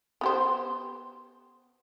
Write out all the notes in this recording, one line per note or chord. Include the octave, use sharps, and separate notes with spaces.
B3 G4 C5